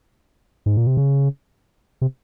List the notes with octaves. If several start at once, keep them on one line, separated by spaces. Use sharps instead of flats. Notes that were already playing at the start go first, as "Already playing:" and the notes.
G#2
A#2
C3
C#3
C3